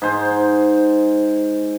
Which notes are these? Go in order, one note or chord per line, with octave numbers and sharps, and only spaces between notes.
G#2 C5